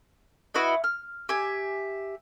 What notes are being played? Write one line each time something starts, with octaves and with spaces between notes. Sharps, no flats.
E4 F#4 B4 D#5
F6
G4 E5 G#5